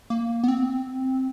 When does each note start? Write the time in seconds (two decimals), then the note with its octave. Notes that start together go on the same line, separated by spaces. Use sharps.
0.10 A#3
0.44 B3
0.48 C4